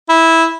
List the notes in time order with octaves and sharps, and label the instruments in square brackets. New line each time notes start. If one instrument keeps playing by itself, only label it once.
[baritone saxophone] E4